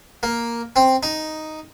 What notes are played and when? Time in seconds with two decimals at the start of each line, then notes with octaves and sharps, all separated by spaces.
0.23 A#3
0.76 C4
1.03 D#4